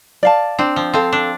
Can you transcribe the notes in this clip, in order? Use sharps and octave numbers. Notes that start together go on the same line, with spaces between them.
D5 F5 A5
C4 D4
F3
C4 A4 F5
D4